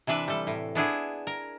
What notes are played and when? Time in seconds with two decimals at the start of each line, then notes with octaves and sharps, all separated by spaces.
0.07 C3 E3 D4 B4 E5
0.28 G3 A4
0.47 A2
0.75 B3 D4 E4 G#4
1.27 A#4